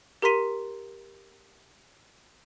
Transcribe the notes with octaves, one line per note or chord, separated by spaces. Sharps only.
G4 A#4 A#5 C6 B6 D#7